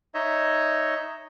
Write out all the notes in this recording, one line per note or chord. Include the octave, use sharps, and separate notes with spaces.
D#4 C#5 D#5 E5